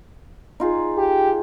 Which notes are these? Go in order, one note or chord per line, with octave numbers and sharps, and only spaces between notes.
D#4 F4 G#4
G4